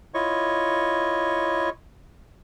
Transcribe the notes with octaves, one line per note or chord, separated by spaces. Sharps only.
E4 F4 C#5 D#5 C#6